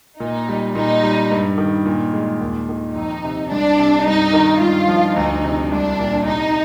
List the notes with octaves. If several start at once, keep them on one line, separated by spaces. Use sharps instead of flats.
A#2 D#4
G3
A#2 D#4
G3
G2
D#3
A#2
G#3
D#2
D#3
F2 D#4
C3
C2 D4
C3
G2 D#4
D#3
G2 F4
F3
D2 D#4
C3
C2 D4
A#2
C3 D#4